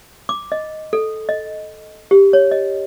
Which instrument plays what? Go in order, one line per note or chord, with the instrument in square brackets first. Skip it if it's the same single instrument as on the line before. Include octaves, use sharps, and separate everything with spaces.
[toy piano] D6
D#5
A4
D#5
G4
C#5
D#5